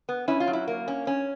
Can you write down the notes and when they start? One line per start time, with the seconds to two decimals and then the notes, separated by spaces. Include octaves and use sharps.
0.09 B3
0.28 C#4 E4
0.40 F4
0.47 F#3
0.53 E4
0.67 A#3
0.88 C#4
1.07 C#4